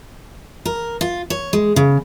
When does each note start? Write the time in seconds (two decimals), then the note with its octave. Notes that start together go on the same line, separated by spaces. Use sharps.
0.65 A#4
1.01 F4
1.30 C#5
1.53 G#3
1.76 C#3